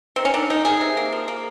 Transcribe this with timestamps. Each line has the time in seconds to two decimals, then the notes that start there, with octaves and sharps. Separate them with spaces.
0.16 D#3 C4
0.25 C#4
0.34 D#3 D4
0.50 D#3 D#4
0.65 D#3 G#4
0.81 C3
0.97 A#3
1.12 F3
1.28 A#3